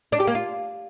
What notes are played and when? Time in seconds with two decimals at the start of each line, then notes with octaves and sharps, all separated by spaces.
0.12 D4
0.20 G4
0.27 A#3
0.35 F4